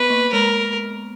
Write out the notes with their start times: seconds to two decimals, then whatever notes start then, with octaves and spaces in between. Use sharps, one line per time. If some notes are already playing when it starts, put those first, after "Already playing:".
Already playing: B3 B4
0.10 A#3
0.33 G#3 A#4